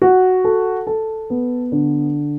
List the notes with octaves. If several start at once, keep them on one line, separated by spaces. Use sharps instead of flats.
F#4
A4
A4
B3
D3